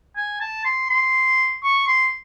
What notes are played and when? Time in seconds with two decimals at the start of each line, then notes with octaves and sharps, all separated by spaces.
0.17 G#5
0.40 A5
0.65 C6
0.90 C6
1.64 C#6
1.88 C6